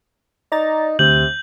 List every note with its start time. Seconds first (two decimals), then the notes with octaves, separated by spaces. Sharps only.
0.52 D#4 D5 A#5 A6
0.99 D2 C3 G6 F#7